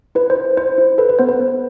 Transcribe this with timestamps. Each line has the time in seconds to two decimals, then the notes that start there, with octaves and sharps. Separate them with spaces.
0.15 E4 B4
0.30 C5
0.36 E4
0.57 E4 C5
0.78 E4
0.98 A4 B4
1.09 B4
1.19 B3 C5
1.29 B4
1.39 B3